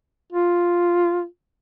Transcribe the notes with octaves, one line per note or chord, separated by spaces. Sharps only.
F4